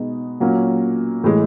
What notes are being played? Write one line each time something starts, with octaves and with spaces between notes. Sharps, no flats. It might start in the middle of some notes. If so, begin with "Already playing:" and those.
Already playing: B2 G#3 B3 D#4
A#2 F#3 A#3 C#4
A2 E3 G#3